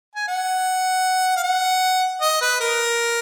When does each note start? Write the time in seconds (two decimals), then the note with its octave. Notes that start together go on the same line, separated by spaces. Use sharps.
0.15 G#5
0.28 F#5
1.36 F5
1.44 F#5
2.21 D#5
2.41 B4
2.60 A#4